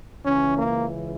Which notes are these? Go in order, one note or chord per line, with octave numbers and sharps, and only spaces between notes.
C#2 C#3 E3 C#4
A#3